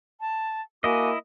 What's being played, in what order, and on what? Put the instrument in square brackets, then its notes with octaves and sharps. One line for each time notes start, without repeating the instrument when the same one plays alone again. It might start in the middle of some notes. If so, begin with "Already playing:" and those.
[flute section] A5
[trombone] A#3 [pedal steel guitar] E4 D#5 [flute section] F#4 G#5 D6